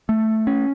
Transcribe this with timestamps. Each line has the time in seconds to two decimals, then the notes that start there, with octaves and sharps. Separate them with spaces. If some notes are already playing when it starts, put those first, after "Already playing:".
0.09 A3
0.47 C#4